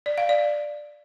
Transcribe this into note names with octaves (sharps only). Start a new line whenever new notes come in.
D5
F5
D5